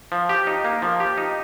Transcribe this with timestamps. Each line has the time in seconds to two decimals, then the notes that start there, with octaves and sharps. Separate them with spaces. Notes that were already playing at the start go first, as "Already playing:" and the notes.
0.12 F3
0.29 G4
0.47 D#4
0.65 A#3
0.82 F3
1.00 G4
1.18 D#4